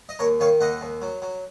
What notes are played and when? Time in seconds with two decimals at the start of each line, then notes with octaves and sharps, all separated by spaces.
0.09 D#5
0.19 D#2 A#4 C#5
0.40 D#3 C#5 F5
0.61 D#2 D#5 F#5
0.81 D#2
1.02 F#3
1.22 F#3